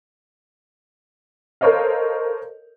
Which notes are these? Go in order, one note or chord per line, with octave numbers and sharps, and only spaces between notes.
A4 A#4 C5 C#5 D#5 F5